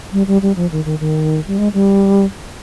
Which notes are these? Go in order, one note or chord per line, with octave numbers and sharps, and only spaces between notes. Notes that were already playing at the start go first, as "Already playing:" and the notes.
G3
G3
G3
F3
D#3
D#3
D#3
G3
G#3
G3